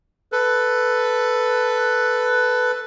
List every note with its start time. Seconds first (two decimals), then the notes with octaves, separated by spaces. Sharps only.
0.32 A4 B4